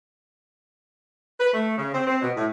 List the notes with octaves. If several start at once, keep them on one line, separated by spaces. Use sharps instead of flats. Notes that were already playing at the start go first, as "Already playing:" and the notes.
B4
A3
C#3
C4
C4
B2
A2